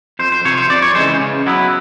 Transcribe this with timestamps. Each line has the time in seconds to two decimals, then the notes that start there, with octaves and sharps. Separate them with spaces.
0.19 F2 C5
0.32 C5
0.45 C3 F3 C#5
0.57 C5
0.70 F2 D5
0.82 C#5
0.95 C#3 E3 G#3 C5
1.20 C#3
1.46 F#3 B3 E4